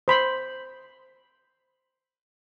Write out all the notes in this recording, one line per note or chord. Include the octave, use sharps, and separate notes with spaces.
C5 B5 C6